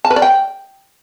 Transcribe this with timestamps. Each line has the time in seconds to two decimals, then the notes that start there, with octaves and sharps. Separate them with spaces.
0.05 A5
0.10 B4
0.16 D5
0.22 G5